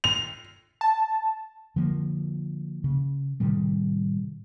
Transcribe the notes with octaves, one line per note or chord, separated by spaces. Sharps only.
F7
A5
D3 F3 A#3
C#3
A2 C3 D#3 G3